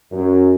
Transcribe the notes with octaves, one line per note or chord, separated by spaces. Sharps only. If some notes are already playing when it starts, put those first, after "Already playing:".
F#2